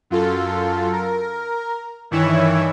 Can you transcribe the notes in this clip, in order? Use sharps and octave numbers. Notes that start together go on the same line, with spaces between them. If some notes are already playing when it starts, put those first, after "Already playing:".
F#2 F4 A4
A#4
G2 D#3 E3 E4 C#5 E5